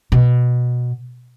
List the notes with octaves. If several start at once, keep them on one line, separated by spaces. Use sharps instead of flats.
B2